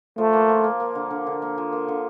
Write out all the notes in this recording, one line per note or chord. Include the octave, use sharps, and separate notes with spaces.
F3 A3
A#3
F3
A#3
A#3
D3
D3
D3
A#3
F3
A#3
D3